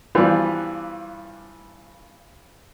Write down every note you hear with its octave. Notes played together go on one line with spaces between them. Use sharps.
G2 E3 F3 G3 B3 F4